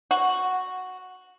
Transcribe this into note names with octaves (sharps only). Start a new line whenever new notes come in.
F#4